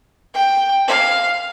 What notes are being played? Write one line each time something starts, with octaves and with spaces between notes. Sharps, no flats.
G5
F5